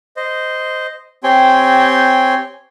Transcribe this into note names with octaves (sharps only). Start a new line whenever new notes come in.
C5 D#5
C4 G4 C#5 G5 G#5 C6